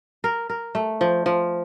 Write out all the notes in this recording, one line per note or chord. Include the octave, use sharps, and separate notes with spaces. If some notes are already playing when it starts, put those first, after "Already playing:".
A#4
A#4
A3
F3
F3